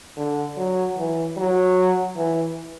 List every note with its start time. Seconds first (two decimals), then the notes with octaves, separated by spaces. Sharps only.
0.17 D3
0.57 F#3
0.97 E3
1.37 F#3
2.16 E3